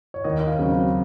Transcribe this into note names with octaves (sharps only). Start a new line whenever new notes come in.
C#5
D#2 D#5
F5
C#3 F#3 C4